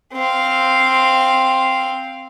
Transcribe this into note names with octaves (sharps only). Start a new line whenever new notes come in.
C4 F5